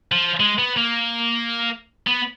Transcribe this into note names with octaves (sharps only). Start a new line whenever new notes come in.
F3
G#3
B3
A#3
B3